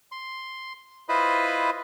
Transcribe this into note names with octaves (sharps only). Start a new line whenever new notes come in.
C6
E4 F4 B4 C5 D#5 B5